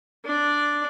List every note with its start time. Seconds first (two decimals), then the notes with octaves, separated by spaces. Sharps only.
0.25 D4 D5